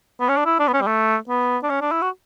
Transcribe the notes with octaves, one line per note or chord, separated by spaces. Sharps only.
B3
C#4
D4
E4
D4
B3
C#4
G3
A3
B3
D4
C#4
D4
E4
F#4